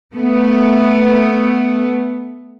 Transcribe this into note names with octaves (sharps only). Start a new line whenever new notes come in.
A3 B3